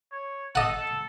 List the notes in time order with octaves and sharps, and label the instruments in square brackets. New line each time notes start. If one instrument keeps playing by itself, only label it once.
[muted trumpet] C#5
[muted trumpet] A4 [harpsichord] D#5 F#5